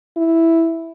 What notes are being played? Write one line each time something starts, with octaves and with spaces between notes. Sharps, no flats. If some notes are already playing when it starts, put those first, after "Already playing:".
E4